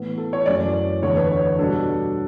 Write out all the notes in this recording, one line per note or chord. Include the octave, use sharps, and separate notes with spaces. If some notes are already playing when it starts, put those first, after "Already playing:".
Already playing: A2 E3 B3
A4
C#5
F#2 E3 A3 C#4 E4 D5
E2 D3 A3 C#5
B4
C#5
B2 G3 D4 A4